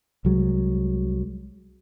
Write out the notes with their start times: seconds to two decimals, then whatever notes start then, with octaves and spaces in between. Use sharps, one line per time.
0.25 C2 F#3 G#3